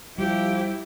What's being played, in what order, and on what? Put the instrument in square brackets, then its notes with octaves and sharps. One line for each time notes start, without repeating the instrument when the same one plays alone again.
[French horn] F3 [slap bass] G3 [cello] E4 [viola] G4